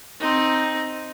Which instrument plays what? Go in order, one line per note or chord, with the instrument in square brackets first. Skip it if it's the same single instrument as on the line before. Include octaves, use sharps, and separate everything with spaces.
[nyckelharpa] C4 D#4